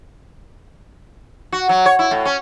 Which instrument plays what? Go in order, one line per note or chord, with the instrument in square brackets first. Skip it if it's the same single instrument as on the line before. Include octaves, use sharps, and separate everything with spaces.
[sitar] F#4
F#3
C#5
E4
A2
C#4